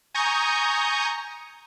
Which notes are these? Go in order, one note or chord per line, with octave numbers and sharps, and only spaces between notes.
G#5 A#5 C#6 D#6 G6